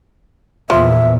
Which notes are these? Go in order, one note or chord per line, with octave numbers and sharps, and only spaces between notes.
E2 A#2 F3 E5